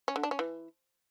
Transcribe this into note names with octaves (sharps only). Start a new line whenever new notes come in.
C#4
D3
D4
C#4
E3